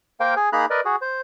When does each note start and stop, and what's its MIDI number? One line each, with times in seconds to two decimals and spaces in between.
0.20 0.34 58
0.20 0.34 70
0.20 0.34 72
0.20 0.34 77
0.20 0.34 79
0.36 0.49 68
0.36 0.49 80
0.53 0.66 58
0.53 0.66 63
0.53 0.66 68
0.53 0.66 82
0.53 0.66 83
0.53 0.66 90
0.70 0.81 70
0.70 0.81 71
0.70 0.81 74
0.70 0.81 75
0.85 0.96 66
0.85 0.96 68
1.02 1.21 72